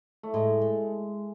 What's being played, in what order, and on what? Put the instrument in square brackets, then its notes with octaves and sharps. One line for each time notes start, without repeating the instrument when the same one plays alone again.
[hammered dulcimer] A3
[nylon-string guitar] A2 [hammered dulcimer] G#3
[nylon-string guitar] A3